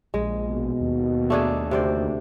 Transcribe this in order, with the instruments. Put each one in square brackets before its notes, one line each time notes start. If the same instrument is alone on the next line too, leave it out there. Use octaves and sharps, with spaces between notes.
[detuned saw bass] A#1 [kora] G#3
[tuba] B2
[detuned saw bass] D#2
[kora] A3 D4 G#4
[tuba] D2 [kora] C3 C5 D5